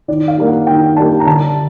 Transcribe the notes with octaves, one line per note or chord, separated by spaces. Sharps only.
D#3 D5
F5
G3 A#3 D4
F#5
D#3 G5
G3 A#3 D4 A5
A#5
D3 A5